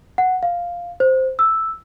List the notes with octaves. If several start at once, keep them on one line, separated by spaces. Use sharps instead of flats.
F#5
F5
C5
E6